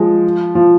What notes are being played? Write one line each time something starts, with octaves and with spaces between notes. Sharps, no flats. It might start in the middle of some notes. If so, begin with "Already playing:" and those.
Already playing: F3 G#3
F3